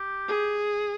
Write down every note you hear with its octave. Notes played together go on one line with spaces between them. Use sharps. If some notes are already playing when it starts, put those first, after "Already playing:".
Already playing: G4
G#4